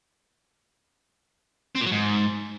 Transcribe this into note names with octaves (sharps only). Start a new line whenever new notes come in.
C4
A#2
F#3
G#2